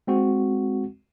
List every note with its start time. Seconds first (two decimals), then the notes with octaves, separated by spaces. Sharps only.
0.07 G#3 C4 F#4